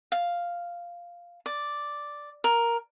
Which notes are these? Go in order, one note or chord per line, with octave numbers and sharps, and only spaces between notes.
F5
D5
A#4